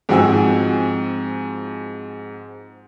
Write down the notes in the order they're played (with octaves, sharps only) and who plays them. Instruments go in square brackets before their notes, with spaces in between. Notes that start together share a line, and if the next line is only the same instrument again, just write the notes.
[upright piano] G#2 F3 C4 F#4 G#5 E6